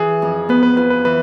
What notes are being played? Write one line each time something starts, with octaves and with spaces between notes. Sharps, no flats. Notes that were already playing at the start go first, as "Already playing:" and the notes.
Already playing: E3 G#4
F2
B3 B4
B4
F4 B4
B4
E3 B4